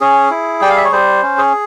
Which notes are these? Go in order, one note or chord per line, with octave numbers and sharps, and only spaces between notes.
C#4 G#4
E4
G3 G5
F5
E5
C#5
G3 C5
C#4
G#4